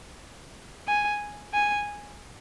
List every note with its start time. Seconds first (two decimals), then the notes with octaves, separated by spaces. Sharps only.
0.88 G#5
1.54 G#5